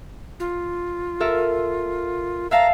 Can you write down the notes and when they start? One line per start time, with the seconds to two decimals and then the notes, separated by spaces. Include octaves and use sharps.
0.40 F4
1.20 A4 A#4 E5
2.51 E5 F5 A5 A#5